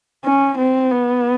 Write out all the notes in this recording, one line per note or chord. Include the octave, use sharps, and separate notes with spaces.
C#4
C4
B3